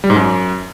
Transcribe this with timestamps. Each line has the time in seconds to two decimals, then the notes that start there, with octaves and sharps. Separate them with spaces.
0.04 G3
0.10 G#2
0.16 F#2